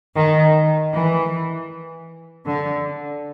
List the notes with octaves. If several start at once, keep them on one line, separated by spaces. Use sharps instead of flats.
D#3
E3
D3